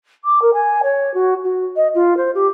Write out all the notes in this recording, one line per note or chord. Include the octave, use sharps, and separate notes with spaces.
D6
A#4
G#5
C#5
F#4
F#4
D#5
F4
C5
G4